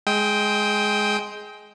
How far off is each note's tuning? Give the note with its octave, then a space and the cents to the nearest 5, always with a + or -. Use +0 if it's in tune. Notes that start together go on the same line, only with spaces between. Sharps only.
G#3 +10 G5 +0 D#6 +40